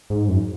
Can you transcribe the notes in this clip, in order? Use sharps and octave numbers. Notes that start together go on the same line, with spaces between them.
G#2
F#2